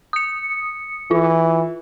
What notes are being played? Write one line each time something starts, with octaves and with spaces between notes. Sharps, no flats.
D#6 C#7
E3 F4